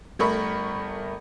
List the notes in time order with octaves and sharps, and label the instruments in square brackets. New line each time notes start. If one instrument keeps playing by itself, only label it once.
[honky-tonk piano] G1 A3 A#4 B5 C#6